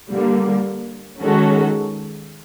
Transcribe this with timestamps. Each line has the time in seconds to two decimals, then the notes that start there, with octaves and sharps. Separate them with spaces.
0.10 D3 G3 A#3
1.20 D#3 G#3 C#4 F#4 A4